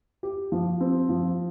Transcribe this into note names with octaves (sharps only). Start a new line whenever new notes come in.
G4
F3
C4
F3